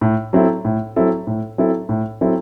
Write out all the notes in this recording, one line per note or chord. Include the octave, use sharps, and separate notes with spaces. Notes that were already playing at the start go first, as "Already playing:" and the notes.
A2
F#3 C4 E4 A4
A2
F#3 C4 E4 A4
A2
F#3 C4 E4 A4
A2
F#3 C4 E4 A4